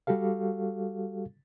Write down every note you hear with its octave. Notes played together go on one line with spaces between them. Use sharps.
G3 F#4 G4 A4 F5